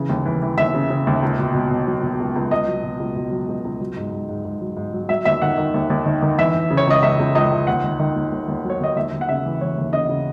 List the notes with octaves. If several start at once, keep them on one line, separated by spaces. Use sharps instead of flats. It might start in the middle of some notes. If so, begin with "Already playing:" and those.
Already playing: C#3 E3
D#2
E3
E3
D#2 E5
C#3
C#3
D#2
C#2
B2
B2
B2
F#3
B2
C#2
C#2
C#2 D#5
F#3
B2
C#2
B2
F#3
C#2
C#2
F#3
G#2
G#2
G#2
G#2
F#3
G#2
F#3
F#3 E5
D#2 E5
D#3 F#5
D#3
D#2
D#2
D#3
D#3
E3 E5
E3
C#3
C#5
C#2 D#5
C#2 E5
C#2
C#2 D#5
C#2
D#2 F#5
D#3
D#3
D#2
D#2
D#2
F#3
C#5
D#2 D#5
D#2 E5
D#2
F#5
C#3 E5
E3
E3 C#5
D#2
C#3 D#5
C#3